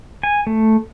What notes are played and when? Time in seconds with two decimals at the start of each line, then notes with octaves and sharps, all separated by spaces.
0.23 G#5
0.47 A3